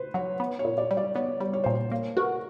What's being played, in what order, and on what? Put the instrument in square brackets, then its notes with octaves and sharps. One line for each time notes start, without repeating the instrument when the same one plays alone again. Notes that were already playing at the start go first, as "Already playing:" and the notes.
Already playing: [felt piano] B4 C5
[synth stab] F#3 [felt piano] C#5
[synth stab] B3
[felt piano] C#5
[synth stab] A#2
[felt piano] D5
[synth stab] G3
[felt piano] D5
[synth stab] B3 [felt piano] C#5
[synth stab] G3
[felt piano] C#5
[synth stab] A#2 [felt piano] C5
[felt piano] C#5
[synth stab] A#3
[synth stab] F#4 [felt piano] A#4